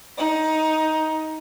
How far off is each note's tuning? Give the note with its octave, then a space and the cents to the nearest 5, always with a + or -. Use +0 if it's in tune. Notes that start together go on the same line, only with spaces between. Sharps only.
D#4 +15